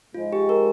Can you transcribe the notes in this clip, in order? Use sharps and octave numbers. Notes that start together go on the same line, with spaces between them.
G#2 F3 G#3 F4
G4
A#4